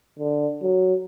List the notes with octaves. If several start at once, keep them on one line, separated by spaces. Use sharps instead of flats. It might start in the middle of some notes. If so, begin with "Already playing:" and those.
D3
F#3